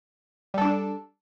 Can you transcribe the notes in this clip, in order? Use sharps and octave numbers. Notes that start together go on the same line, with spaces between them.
G3 D4 A4